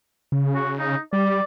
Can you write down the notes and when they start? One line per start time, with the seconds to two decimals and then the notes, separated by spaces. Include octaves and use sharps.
0.32 C#3
0.55 F#4
0.78 D#4
1.13 G3 D5